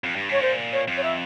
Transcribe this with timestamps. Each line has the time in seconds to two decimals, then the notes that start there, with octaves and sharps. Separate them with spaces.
0.04 F2
0.16 G2
0.29 G#2 C#5
0.41 A#2 C5
0.73 C#5
0.87 F2
0.97 C#5
1.03 E5